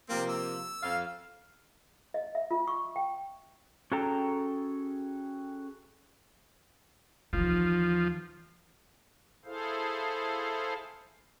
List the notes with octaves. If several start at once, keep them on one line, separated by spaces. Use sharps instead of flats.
C3 F3 A#3 C4
E6
F2 F5
D#5
E5
F4
C#6
G5
C#4 F#4 G#4 A4 G5 A#5
D#2 E3 F3
E4 G#4 A4 C5 F5